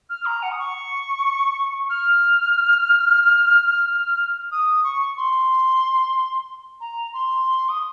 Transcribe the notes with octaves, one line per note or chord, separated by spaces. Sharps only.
F6
A#5
F#5
D#6
C#6
F6
D#6
C#6
C6
A#5
C6
D#6